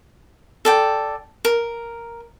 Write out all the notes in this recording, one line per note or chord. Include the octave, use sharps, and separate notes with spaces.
A4 D5 G5
A#4